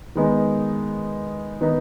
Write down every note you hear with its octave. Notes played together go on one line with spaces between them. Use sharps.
D#3 G#3 B3 D#4
D#3 B3 D#4